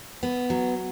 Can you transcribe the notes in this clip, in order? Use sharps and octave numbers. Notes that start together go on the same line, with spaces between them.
B3
F#3